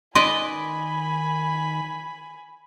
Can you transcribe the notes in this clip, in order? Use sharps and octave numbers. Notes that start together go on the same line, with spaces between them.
D#3 B4 D5 D#5 G#5 B5 C6